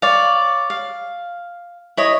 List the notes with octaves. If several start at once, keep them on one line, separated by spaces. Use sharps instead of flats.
C#5 D5 F5
F5
E4 C#5 D#5